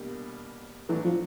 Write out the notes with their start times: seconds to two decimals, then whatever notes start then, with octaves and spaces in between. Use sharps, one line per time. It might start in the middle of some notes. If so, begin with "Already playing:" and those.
Already playing: B2 G3 A#3 D4 G4
0.89 A2 E3 F#3 A3 D4
1.04 F3